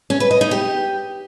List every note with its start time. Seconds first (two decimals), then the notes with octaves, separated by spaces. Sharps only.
0.10 C#4
0.20 B4
0.31 D#5
0.41 D#4
0.51 G4